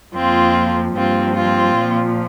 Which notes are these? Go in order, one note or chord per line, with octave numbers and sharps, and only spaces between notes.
F2 F3 A#3 C4 F4
G2 F3 A#3 C4 F4
C4 F4
A#2 F3 A#3